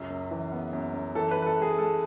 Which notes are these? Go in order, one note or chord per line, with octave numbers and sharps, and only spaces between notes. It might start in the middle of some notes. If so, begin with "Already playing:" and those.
Already playing: C#2 F#2
F#2
E3
B3
F#2
F#2
E3 A4
B4
E3
B4
A4
G#3 G#4
G#3 A4